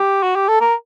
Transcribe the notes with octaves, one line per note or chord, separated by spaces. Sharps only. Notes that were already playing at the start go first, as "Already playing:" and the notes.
Already playing: G4
F#4
G4
A4
A#4